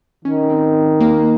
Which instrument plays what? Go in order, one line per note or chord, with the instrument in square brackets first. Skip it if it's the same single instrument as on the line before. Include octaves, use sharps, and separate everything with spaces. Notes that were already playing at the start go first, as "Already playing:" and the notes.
[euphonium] D#3 [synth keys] C#4
[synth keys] C4
A#3